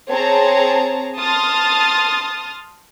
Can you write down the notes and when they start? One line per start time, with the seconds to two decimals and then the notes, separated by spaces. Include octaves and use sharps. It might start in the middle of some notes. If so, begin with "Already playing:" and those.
0.10 C4 G#4 C#5 A5 A#5
1.18 A5 C6 D#6 F6 A6